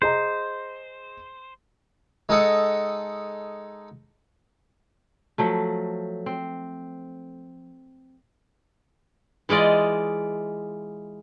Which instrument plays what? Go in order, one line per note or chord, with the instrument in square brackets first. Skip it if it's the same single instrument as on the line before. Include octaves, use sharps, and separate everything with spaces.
[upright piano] G#4 D#5 A#5 [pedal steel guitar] C5
[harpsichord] G#3 D#4 A4 D#5 F#5
[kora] F3 F#3 A3
C4
[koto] E3 G#3 F4 D5 D#5